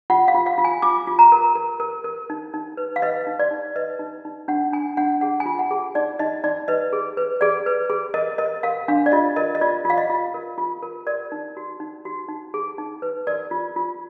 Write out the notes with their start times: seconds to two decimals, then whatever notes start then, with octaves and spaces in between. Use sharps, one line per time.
0.10 F4 F#5
0.28 F5
0.34 F4
0.46 F5
0.58 F4
0.65 G#5
0.82 F4 D6
1.07 F4
1.19 A#5
1.32 A#4
1.55 A#4
1.80 A#4
2.04 A#4
2.30 D#4
2.54 D#4
2.77 B4
2.96 F5
3.02 B4 D#5
3.27 D#4
3.39 D5
3.51 D#4
3.76 B4 D#5
3.99 D#4
4.25 D#4
4.48 D4 F#5
4.73 D4 G#5
4.97 D4 F#5
5.21 G#4 F#5
5.40 G#5
5.46 F4
5.59 F#5
5.71 G#4
5.95 D#4 D5
6.19 D#4 D#5
6.44 D#4 D5
6.68 B4 D#5
6.93 G#4
7.17 B4
7.41 G#4 D5
7.66 B4
7.90 G#4
8.14 A#4 D#5
8.38 A#4 D#5
8.63 A#4 F5
8.88 D4 F5
9.06 D5
9.12 F4 D#5
9.36 A#4 D#5
9.55 D#5
9.61 F4 D5
9.85 F4
9.90 F5
9.98 D#5
10.10 F4
10.34 A#4
10.58 F4
10.82 A#4
11.07 A#4 D5
11.32 D#4
11.57 F#4
11.80 D#4
12.05 F#4
12.29 D#4
12.54 G#4
12.78 D#4
13.02 B4
13.27 A#4 D5
13.51 F4
13.76 F4